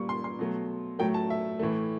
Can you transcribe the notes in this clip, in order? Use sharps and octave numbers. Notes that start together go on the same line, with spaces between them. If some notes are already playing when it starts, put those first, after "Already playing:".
Already playing: A#2 G3 C#6
C6
C6
B2 F#3 A3
A2 F#3 A3 G5
A5
E5
A2 E3 A3